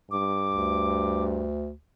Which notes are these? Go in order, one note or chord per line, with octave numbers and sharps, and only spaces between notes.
G2 D6
D2